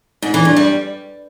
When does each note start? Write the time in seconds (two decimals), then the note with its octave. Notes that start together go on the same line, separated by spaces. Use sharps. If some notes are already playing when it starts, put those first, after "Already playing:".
0.22 G#2
0.34 E3
0.45 G2
0.57 G3